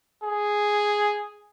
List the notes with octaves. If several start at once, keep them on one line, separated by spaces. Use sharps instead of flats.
G#4